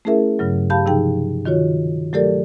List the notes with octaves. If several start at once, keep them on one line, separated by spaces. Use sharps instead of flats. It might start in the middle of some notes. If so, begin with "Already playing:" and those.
A3 C#4 E4 G#4 A#4 E5
G2 C#3 F#3
G4 F5 A5 B5 G6
C3 F3 D#4 G#4 G5
D#3 F4 F#4 C#5
F#3 A3 G4 A4 A#4 D5